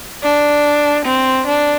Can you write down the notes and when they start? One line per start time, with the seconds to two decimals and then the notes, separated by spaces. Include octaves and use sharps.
0.23 D4
1.05 C4
1.46 D4